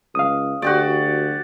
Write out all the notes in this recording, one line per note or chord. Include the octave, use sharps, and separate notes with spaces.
C#2 F5 D#6
D2 F#4 G4 D5